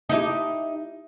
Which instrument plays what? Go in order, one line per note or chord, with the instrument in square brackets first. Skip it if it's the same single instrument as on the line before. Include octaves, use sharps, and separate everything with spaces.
[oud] D#4 E4 G4